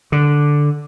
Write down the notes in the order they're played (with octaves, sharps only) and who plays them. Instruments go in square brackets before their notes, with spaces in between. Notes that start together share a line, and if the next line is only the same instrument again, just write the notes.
[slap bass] D3